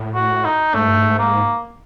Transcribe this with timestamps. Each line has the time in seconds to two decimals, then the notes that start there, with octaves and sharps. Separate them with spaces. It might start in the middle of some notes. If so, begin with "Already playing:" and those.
Already playing: A2
0.15 F#4
0.45 D#4
0.74 G#2 A3
0.86 G2
0.98 G#2
1.19 A#3